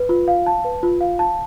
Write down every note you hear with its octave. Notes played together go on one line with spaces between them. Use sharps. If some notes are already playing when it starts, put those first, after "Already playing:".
Already playing: B4
F4
F5
A5
B4
F4
F5
A5